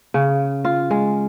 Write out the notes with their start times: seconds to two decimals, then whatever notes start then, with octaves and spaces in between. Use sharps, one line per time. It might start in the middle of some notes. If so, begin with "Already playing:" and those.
0.14 C#3
0.65 F4
0.91 G#3